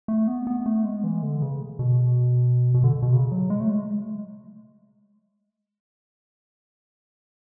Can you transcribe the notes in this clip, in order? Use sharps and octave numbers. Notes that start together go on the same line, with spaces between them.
A3
B3
B3
A3
G#3
E3
D3
C#3
B2
B2
D3
B2
C#3
F#3
G#3
A3
G#3